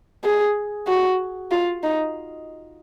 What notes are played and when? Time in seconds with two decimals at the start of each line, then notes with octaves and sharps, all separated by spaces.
0.24 G#4
0.87 F#4
1.51 F4
1.83 D#4